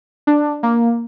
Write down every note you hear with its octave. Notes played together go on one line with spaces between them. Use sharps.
D4
A#3